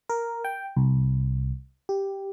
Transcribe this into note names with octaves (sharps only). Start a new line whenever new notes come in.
A#4
G5
C2
G4